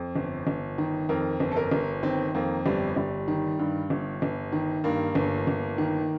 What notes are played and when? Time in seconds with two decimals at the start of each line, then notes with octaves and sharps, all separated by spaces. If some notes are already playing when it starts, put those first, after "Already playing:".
Already playing: F2
0.16 G1
0.47 G1
0.78 D#3
1.09 F2 A#4
1.40 G1
1.52 A4
1.56 A#4
1.71 G1
2.03 D#3 C4
2.35 F2 A#3
2.66 G1 G3
2.96 G1 G3
3.28 D#3
3.59 G2
3.90 G1
4.22 G1
4.52 D#3
4.84 G2 A#3
5.15 G1
5.47 G1
5.78 D#3